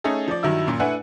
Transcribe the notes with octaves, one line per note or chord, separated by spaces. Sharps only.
A3 C#4 D#4 G#4 A4
F3 D5
G2 D#3 F#3 E4 E6
F#2 A#2
A3 D4 E4 B4 F#5 G#5